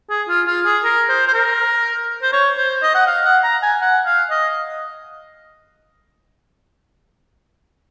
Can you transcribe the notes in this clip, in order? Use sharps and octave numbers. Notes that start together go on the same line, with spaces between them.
G#4
F4
F4
G#4
A#4
C5
C5
A#4
C5
C#5
C5
D#5
F#5
F5
F#5
A#5
G#5
F#5
F5
D#5